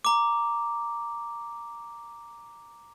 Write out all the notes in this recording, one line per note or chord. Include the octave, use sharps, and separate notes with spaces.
A#5 D6